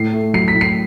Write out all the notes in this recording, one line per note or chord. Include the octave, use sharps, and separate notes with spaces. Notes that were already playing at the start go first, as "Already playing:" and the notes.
Already playing: A2 C7
A3
F#3 C7
B6
A2
C7